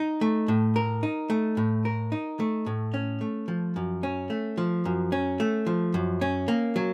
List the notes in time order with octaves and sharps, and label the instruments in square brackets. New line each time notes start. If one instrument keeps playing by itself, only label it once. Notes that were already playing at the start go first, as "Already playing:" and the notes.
Already playing: [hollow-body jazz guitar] D#4
A3
A2
A#4
D#4
A3
A2
A#4
D#4
A3
A2
C#4
A3
F3
F#2
C#4
A3
F3
F#2
C#4
A3
F3
F#2
C#4
A#3
F#3